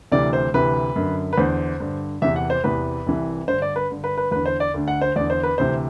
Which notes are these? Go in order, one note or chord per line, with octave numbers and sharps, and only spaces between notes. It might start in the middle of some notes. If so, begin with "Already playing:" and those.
D2 C3 E3 D5
C5
D2 C3 E3 B4
F#2 D3
B4
E2 D3 C5
G2 D3
E2 C3 E3 E5
F#5
C5
E2 C3 E3 B4
C2 C3 E3
G2 D3 C5
D5
B4
G2 D3
B4
B4
E2 D3 B4
C5
D5
D2 D3
F#5
C5
E2 D3 D5
C5
B4
D2 C3 E3 C5